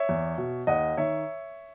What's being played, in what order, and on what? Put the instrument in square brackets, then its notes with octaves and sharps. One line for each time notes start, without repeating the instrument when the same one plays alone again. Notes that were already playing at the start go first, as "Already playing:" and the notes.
Already playing: [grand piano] C#5 E5
E2
B2
D#2 D#5 F#5
D#3 C#5 E5